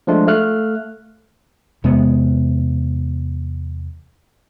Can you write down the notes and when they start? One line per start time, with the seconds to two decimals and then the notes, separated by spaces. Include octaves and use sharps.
0.07 F3 G#3 A3 D4 F4
0.27 A3 F5 F6 F#6
1.84 E2 C3 G#3 B3